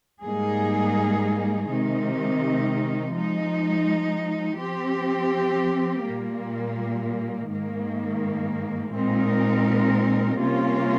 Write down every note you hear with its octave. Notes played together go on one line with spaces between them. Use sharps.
G#2 G3 A#3 D#4 G#4
C3 D#3 G#3 D#4
F3 G#3 D#4
F3 C4 G4
A#2 G3 A#3
G#2 D#3 A#3
A#2 G#3 C4 D#4 A#4
C3 G3 A#3 C#4 F4